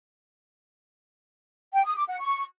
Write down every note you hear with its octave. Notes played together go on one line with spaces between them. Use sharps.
G5
D#6
D6
F#5
C#6